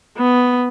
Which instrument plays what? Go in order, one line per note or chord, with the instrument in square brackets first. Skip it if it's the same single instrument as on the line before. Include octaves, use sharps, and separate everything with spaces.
[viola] B3